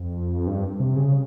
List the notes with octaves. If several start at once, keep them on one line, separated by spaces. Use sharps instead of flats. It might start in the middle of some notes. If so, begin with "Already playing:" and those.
Already playing: F2
G2
C3
C#3